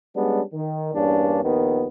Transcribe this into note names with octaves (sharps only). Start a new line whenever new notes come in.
G3 G#3 B3 C#4 D4
D#3
E2 G2 A#3 C#4 D4
A#1 D#2 D#3 B3